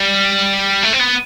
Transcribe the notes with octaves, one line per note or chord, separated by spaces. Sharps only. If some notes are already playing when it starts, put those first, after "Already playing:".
Already playing: G3
A3
C4
B3